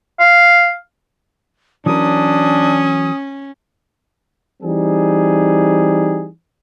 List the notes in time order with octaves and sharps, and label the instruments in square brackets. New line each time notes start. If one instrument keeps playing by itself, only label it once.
[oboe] F5
[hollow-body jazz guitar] E3 F#3 A#4 [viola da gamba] C#4 [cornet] D4 [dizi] D#6
[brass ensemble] E3 G3 C4 D#4 G#4